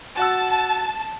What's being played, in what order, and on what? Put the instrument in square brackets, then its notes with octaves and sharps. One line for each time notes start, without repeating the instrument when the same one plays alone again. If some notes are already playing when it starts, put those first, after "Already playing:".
[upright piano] F#4 F#5 E6 [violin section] A5